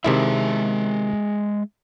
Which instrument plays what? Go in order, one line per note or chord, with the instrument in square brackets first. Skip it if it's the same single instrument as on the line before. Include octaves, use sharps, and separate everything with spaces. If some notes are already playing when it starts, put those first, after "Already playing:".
[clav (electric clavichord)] C3 D#3 E4 [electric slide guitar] G#3 G#4 E5